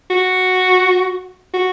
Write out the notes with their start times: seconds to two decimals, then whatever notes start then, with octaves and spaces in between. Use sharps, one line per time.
0.10 F#4
1.54 F#4